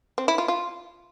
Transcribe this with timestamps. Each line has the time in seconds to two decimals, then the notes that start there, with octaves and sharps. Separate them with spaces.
0.18 C4
0.28 E4
0.38 F4
0.48 F4